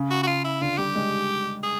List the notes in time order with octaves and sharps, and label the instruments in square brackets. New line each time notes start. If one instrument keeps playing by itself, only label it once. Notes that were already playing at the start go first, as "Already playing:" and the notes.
Already playing: [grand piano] C#3
[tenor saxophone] F#4
F#4
F4
E4
[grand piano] D3 [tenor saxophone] F4
[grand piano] G3 [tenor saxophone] G4
[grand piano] G#3
[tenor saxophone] G#4